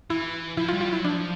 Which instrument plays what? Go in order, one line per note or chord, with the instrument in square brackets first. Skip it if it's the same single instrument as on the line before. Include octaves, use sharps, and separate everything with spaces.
[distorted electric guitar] E3 [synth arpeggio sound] E4
[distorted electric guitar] F3 [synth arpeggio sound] E4
[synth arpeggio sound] F4
[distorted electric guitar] G3
[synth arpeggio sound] F4
[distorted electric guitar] F#3 [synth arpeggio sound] E4
[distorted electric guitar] F3 [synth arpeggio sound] D4